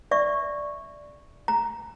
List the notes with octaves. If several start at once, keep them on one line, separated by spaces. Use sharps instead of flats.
D5 E5 C#6
A#5